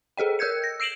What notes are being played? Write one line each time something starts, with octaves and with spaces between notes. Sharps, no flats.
G#4 A4 D#5 G5
A#4 E6 G6 G#6 C#7
A#6
E6 C7 D7 E7 F#7